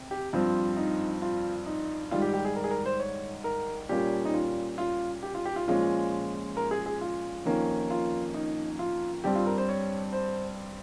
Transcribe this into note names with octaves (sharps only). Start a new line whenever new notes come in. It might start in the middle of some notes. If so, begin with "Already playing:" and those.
Already playing: C3
G4
G2 F3 C4 F4
D#4
F4
D#4
G#2 D#3 G3 F4
G4
G4
G#4
A#4
G#4
A#4
C5
C#5
A#4
A#2 G3 A#3 C#4 G4
D#4
F4
F4
G4
F4
G4
F4
A#2 F3 G#3 C#4 F4
A#4
G#4
G#4
F4
F2 D#3 A#3 C#4
F4
D#4
F4
G2 G3 C4 G4
F4
A#4
C5
C#5
C5